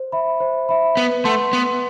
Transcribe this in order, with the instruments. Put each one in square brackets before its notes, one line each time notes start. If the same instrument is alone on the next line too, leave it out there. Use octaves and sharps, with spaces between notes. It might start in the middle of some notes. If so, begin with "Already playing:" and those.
Already playing: [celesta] C5
E5 B5
C5
E5 B5
[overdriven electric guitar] B3 [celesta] B4
[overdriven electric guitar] A3 [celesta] F#5 A5 C6
[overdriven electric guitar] B3 [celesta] B4